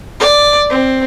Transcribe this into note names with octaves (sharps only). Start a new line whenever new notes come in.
D5
C4